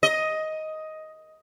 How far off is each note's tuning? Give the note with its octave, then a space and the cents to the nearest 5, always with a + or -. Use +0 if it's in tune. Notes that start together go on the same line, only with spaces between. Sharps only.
D#5 +10